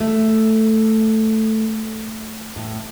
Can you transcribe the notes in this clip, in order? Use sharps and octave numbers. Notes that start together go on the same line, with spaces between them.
A3
A2